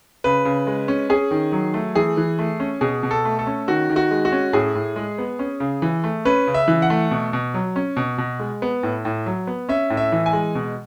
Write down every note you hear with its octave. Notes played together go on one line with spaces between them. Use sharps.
C#3 B4
C#3
G#3
C#4
C#4 G#4
D#3
F#3
A3
E3 G#4
E3
A3
C#4
B2 G#4
B2
A4
A3
A4
C#4
D#3 F#4
D#3
F#4
G#3
F#4
C#4
A2 G#4
A2
G#3
B3
C#4
C#3
E3
A3
C#4 B4
C#3
E5
E3
F#5
A3
B2
B2
F#3
C#4
B2
B2
G#3
B3
A2
A2
F#3
B3
C#4 E5
A2
E5
E3
G#5
G#3
B2